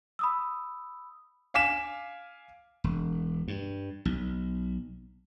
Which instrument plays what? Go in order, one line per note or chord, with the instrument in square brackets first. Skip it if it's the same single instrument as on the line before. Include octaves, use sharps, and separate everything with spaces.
[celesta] B5 D#6 E6
[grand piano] F5 G#5 D6 B6 E7
[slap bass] E1
G2
B1